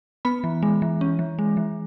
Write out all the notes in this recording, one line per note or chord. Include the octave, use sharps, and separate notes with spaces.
B3 B5
E3
G#3
E3
C#4
E3
G#3
E3